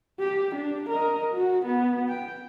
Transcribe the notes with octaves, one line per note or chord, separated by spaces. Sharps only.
G4
D4
A#4 D#5
F#4
B3
G5